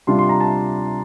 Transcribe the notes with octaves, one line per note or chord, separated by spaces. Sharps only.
C3 G3 D4 F4 C6
C6
A#5
A5